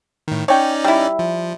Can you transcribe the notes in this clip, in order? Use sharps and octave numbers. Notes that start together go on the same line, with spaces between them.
A2 D#3
C#4 D#4 C#5 D5 G5
G3 E4
F3